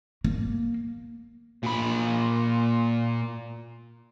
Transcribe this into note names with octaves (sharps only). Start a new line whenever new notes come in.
A#3
A#2 B5